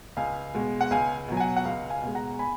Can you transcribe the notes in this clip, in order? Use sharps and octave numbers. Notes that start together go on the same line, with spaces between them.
C#2 F5 G#5
B2 G#3
F#5
C#2 F5 G#5
B2 F#3
G#5
F#5
F#5
C#2 F5
F5 G#5
B2 G#3
F#5 A#5
G#5 B5